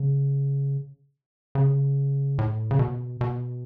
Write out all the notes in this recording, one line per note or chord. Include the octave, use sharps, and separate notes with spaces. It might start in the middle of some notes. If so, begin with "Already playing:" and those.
Already playing: C#3
C#3
A2
C#3
B2
B2